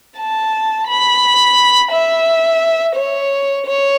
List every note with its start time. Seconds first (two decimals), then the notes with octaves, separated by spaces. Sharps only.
0.19 A5
0.88 B5
1.91 E5
2.96 C#5
3.66 C#5